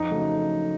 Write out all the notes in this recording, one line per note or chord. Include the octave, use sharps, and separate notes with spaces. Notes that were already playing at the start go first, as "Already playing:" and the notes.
Already playing: F2 D#4
C#3 F#3 A3